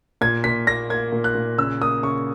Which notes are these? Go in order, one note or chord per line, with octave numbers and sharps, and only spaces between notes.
A#2 G#6
A#2 B6
A#3 A#6
A#3 G#6
A#2
F#6
A#2
C#3 E6
A#3 D#6
C#3 C#6